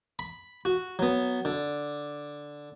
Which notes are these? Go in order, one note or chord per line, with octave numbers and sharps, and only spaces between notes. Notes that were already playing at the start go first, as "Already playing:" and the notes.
B5
F#4
F#3 B3
D3